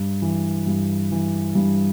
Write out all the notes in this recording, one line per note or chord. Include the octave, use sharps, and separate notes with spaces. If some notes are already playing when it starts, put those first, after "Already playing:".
Already playing: G2
E3
G2
E3
G2